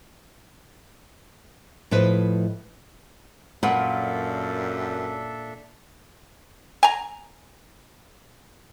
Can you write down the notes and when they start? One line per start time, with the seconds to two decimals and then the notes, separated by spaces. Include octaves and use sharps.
1.91 A2 F3 A3 B4 D#5
3.63 F#2 A#2 D4 A4 B4 E5 F#5
6.83 G#5 A#5